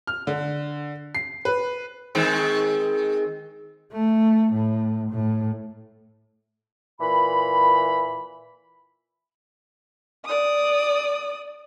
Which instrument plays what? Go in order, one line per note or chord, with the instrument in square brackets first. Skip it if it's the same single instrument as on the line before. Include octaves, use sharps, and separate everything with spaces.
[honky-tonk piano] F6
D3
C7
B4
[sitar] D#3 G#3 C4
[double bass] A3
A2
A2
[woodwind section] A#2 E3 B5
[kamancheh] D5 D#6